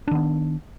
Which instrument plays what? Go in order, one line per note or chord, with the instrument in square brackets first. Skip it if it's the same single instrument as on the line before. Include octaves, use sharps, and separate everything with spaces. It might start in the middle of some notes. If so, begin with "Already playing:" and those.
[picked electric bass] D4
D#3
B3